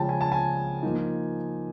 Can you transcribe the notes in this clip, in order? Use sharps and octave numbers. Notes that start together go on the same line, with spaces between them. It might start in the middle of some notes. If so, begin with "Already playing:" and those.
Already playing: C#3 F3 G#3 C#4 G5 A5
G#5
A5
G#5
F3 A#3 D#4